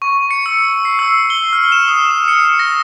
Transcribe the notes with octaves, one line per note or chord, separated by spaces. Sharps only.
C#6
C#7
E6
C7
E6
G7
F6
E7
D#6
E7
C#7
A#6